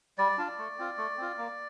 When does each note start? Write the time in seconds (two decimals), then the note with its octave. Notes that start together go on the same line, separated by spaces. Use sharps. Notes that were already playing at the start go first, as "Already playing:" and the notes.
0.18 G3 D5
0.38 D4 F4
0.58 A3
0.78 C4 F4
0.97 A3
1.18 C4 F4
1.37 A#3